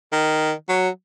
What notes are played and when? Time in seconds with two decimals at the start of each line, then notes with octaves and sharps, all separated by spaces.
0.12 D#3
0.69 F#3